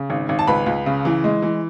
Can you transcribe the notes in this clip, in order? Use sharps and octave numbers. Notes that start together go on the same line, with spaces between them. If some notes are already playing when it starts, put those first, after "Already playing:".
Already playing: C#3
G#1
G#1
A5
C#2 B4 B5
C#2
C#3
E3
G#3
E3